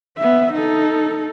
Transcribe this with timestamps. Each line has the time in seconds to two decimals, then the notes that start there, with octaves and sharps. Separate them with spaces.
0.17 B3 E5
0.53 D#4 A4